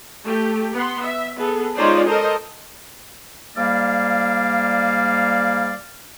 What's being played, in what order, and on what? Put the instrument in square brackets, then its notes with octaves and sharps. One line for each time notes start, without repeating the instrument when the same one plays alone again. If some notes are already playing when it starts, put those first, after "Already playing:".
[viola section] A3 G4
B3 C6
E5
B3 G#4 A4
G#3 C#4 D#4 F4 C5 D5
A4 A#4 C5 D#5
[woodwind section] G#2 G3 A#3 D5 F5